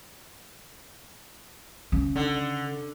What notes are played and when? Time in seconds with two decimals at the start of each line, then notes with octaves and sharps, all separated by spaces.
1.92 C#3
2.16 D3